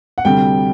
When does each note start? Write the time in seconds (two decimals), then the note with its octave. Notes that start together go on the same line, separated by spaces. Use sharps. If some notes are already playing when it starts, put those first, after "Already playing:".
0.18 F#5
0.25 D2 C3 G3 G5